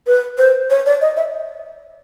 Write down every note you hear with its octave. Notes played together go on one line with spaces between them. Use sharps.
B4
C5
C#5
D5
D#5
E5